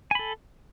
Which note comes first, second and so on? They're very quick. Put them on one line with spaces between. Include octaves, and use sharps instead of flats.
G#5 B5 A4